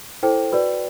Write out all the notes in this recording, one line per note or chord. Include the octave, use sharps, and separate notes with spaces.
E4 A4 C5 G5
F#4 B4 D5